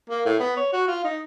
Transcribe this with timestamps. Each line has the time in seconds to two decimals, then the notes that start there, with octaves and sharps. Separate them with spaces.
0.10 A#3
0.25 A2
0.39 B3
0.57 C#5
0.73 F#4
0.88 F4
1.04 D#4